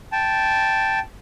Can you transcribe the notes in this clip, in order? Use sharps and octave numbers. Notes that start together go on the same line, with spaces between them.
G5 A5